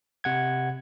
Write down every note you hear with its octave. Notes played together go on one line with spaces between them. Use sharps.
C3 F#5 G#6